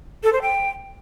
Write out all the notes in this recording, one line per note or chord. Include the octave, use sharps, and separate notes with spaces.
A4
C5
G5